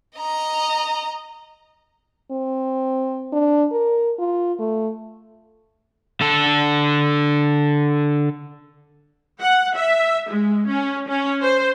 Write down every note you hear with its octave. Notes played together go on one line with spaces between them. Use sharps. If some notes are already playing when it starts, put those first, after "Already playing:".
D#5 A#5
C4
D4
A#4
F4
A3
D3 A4
F#5
E5
G#3
C#4
C#4
C5